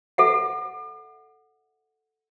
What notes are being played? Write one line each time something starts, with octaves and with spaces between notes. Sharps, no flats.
A4 E5 F#5